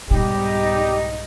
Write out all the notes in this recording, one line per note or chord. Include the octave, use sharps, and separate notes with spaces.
C2 G#2 B2 G3 D#4 G4